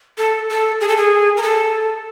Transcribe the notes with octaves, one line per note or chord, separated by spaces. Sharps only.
A4
A4
G#4
A4
G#4
A#4
A4